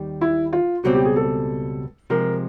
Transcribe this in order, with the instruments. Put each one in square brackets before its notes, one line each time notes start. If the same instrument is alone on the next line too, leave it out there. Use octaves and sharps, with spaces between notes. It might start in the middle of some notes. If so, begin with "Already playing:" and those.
Already playing: [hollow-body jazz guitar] D#2 D#3 G3
[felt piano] E4
F4
[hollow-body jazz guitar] C#2 B2 G3 C4 [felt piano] F#4
[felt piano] G4
G#4
A4
[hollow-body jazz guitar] C3 F3 G#3 [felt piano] A#4